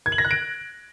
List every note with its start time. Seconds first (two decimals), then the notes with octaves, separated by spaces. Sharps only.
0.06 G#6
0.12 F#7
0.18 A#6
0.24 F#6
0.31 D7